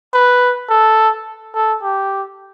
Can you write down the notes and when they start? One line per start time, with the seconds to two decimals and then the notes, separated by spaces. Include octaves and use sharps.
0.13 B4
0.70 A4
1.54 A4
1.83 G4